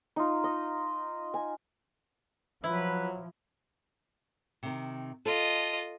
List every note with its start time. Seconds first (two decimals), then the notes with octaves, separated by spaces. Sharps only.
0.16 D#4 F4
0.44 D#5
1.34 G#5
2.64 F3 F#3 E4 B4
4.63 C3 D#3
5.26 F4 A4 D#5